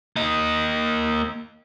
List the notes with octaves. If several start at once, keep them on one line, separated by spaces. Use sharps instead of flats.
A#3 D#5